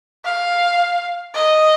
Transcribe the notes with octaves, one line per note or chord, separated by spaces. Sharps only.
F5
D#5